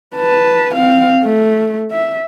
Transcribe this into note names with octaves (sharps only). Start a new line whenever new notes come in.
B4 A5
C4 F5
A3
E5